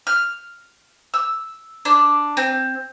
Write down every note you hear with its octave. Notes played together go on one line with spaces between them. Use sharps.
F6
E6
D4
C4